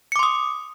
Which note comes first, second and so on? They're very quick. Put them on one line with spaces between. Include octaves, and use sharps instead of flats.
C#7 D6 C6 D#6